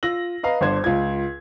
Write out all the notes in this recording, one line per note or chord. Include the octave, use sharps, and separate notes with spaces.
F4 E6 A#6 F#7
B4 D#5 F5 A#5
G1 D4 C5 G#6
C#2 F4 G#6